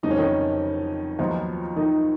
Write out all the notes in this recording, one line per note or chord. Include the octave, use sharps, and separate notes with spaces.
F1 F2 C#3 F#3 B3 D#4
C#4
D#3 D#4
D#2 D#3 F3 F#3 B3 D#4 F4
D#3 D#4